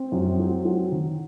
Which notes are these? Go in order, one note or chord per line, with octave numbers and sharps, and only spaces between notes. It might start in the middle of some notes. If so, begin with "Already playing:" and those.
Already playing: C4
F#2
F#3
F#3
D#3